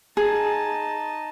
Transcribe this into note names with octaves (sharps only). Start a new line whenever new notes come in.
D#4 G#4 A5